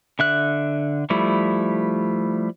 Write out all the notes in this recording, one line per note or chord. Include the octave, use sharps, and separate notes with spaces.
D3 E5 F#6
F3 G3 A3 E4